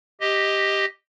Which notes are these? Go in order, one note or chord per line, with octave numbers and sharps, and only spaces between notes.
G4 D#5